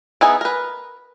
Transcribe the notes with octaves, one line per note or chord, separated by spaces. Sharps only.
B3 D#4 E4 G#4 G#5
A#4 B4